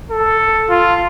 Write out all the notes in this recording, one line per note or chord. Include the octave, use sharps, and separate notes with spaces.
A4
F4